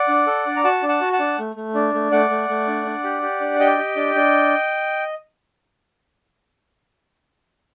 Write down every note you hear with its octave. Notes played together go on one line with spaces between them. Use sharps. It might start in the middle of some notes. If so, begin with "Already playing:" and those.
Already playing: D5 F#5
D4
A4
D4
A#5
F#4 F#5 A5
D4
F#5 A5
F#4
F#5 A5
D4
A3
A3
D4
A3
A3 D5 F#5
A3
A3
D4
D4
G4
G4
D4
G4 D#5 G5
G4
D4
D4